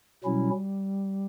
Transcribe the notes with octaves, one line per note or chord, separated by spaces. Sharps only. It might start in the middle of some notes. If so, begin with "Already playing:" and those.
B2 F#3 G3 C#4 E4